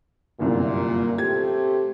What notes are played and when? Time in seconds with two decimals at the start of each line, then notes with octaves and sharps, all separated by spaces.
0.40 G1 C2 F#2 A#2
1.18 A3 C4 G4 G#6